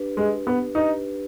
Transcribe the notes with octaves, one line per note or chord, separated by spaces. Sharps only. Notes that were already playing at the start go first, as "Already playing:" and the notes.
Already playing: D4 G4 B4
G#3
B3
D4 D#4 G4 B4